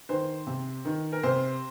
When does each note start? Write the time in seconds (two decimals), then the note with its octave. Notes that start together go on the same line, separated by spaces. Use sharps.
0.09 D#3 C5
0.46 C3
0.85 D#3
1.12 A#4
1.23 C3 C5